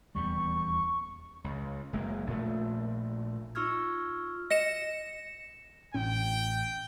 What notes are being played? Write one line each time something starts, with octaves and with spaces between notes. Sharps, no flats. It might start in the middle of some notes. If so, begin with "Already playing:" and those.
D#1 E2 G3 C#6
C#2
F#1 G#3 A#3
A#1 A#2 A3
D#4 F4 C#6 E6 F6 G#6
D#5 A#6 C#7 E7
A1 A2 C#4 G5